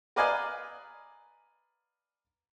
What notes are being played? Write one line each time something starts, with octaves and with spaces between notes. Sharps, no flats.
A#4 B4 D5 D#5 F5 G#5